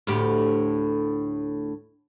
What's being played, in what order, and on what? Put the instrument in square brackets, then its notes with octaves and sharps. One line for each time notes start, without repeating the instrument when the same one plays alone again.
[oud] D2 A2 G4